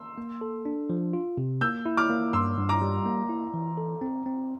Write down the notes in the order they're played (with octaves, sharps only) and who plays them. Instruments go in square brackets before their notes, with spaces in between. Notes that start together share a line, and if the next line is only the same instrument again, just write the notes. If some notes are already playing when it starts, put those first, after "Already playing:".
Already playing: [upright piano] C6 E6
[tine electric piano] A#3
A4
D4
F3
F4
C3
[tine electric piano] A#3 [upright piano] E6 G6
[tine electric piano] E4
[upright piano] D6 F6
[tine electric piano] A#3
[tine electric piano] G2 [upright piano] C6 E6
[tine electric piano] G2
[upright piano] A#5 D6
[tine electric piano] G3
A#3
E4
E3
A4
C4
C4